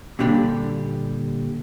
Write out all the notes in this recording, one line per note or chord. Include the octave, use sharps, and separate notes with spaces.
A#2 D3 G3 D4 G4